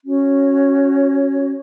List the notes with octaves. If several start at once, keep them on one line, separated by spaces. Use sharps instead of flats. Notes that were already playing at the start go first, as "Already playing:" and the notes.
C#4 F#4 C#5